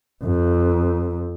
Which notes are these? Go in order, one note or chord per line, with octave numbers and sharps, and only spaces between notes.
F2